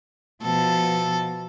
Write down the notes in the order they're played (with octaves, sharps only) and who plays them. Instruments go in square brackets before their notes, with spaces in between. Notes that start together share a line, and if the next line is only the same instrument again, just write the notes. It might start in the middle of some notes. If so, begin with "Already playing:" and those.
[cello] B2 F3 [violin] A4